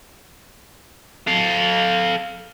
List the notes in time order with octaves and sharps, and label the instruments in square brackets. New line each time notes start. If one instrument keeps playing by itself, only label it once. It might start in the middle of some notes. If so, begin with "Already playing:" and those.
[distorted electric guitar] A4 F5